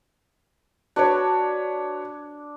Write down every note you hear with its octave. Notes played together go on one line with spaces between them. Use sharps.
D4 F#4 B4 C#5